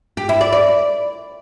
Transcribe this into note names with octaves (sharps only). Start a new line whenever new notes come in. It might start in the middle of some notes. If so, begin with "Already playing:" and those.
G4
E4
D5
D5